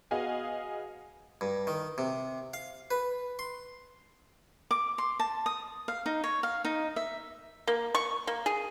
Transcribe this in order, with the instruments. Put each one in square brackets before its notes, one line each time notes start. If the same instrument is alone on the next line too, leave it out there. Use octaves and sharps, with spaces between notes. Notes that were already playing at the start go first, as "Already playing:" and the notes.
[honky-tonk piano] B3 F#4 G#4 D#5 F5 G#5
[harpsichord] G2
D#3
C3
F5
B4
C6
[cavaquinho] D6
C6
A5
D#6
F5
D#4
C#5
F5
D#4
E5
[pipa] A#3
C#6
A#3
G#4